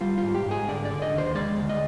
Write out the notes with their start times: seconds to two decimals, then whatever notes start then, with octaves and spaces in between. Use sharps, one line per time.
0.01 G3 F4
0.18 F4
0.23 G#2
0.35 G4
0.46 G#2
0.51 G#4
0.68 D3 D5
0.85 D5
0.91 D3
1.02 D#5
1.13 D#2 C5
1.35 G#3 D5
1.58 D2
1.69 D#5